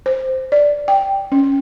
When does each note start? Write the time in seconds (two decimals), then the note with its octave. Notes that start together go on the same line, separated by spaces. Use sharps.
0.06 C5
0.52 D5
0.88 G5
1.32 C#4